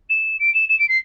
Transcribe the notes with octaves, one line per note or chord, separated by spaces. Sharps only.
E7
D7
E7
E7
D7
C7